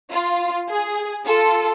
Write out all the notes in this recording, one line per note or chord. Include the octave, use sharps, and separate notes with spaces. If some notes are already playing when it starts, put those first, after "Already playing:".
F4
G#4
F4 A4